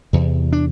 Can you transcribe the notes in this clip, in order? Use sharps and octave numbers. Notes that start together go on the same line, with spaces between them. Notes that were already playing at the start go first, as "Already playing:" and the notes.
E2 C3
D4